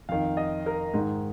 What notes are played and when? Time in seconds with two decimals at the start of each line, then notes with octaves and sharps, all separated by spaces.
0.09 F2 D#3 F5
0.37 D#5
0.66 A#4
0.94 G#2 D#3 D#4